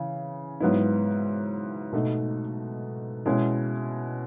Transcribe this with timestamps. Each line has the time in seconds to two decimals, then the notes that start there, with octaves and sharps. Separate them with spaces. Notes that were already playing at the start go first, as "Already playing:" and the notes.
Already playing: C#3 E3
0.60 G#2 F#3 B3 E4
1.93 B2 A3 D#4
3.26 B2 G#3 C#4 E4